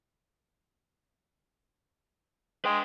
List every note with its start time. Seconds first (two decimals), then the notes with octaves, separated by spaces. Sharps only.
2.65 G#3 B4 G5